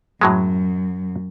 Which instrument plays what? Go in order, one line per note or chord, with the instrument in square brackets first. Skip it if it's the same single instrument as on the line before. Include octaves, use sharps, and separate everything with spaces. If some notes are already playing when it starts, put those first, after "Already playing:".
[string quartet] F#2 [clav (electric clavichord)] A2 F#3 G#3